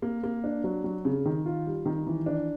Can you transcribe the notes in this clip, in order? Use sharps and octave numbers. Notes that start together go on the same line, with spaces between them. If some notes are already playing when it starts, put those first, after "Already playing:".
A#3
A#3
D4
F#3
F#3
C#3
D#3
F4
G3
D#3
E3
D4